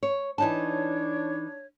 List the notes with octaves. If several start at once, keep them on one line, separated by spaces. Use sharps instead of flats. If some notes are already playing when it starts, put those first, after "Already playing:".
C#5
E3 D4 D#4 C#5 A5